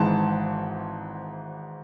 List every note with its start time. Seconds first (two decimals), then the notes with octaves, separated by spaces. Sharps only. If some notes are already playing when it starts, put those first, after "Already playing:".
Already playing: G#1 G#2 E3 A5